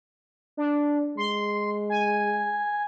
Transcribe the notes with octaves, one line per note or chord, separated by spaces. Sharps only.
D4
G#3 C6
G#5